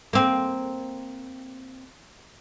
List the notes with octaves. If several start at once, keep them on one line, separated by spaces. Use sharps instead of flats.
A#3 C4